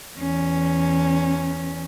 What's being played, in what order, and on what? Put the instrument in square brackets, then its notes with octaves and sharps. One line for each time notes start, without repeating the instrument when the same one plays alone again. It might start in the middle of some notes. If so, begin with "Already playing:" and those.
[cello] E2 C#4